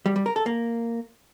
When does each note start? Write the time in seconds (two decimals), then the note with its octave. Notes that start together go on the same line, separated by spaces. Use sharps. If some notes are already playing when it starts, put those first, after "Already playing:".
0.06 G3
0.16 G3
0.26 A#4
0.36 A4
0.46 A#3